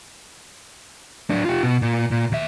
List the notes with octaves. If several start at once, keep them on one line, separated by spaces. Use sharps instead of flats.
F#3 D4
F4 G4
B2
A#2
A#2
D#2 E5